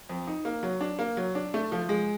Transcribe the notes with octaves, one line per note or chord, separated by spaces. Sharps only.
F2
D#4
A#3
F#3
D4
A#3
F#3
D4
A3
F3
G#3